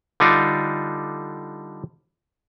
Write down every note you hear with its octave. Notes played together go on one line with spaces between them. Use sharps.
D3 G3 D4 D#4 F4